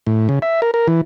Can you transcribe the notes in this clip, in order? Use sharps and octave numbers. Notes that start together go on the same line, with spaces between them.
A2
C#3
E5
A#4
A#4
E3